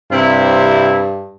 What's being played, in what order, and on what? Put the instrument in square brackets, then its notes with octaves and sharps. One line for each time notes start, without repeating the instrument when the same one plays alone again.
[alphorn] G2 [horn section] C3 C4 E4